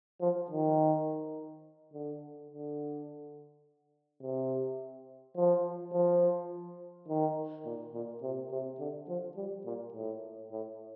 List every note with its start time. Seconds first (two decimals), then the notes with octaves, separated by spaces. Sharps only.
0.21 F3
0.50 D#3
1.93 D3
2.50 D3
4.22 C3
5.36 F3
5.93 F3
7.08 D#3
7.66 A#2
7.94 A#2
8.22 C3
8.51 C3
8.79 D3
9.08 F3
9.36 G3
9.65 A#2
9.94 A2
10.51 A2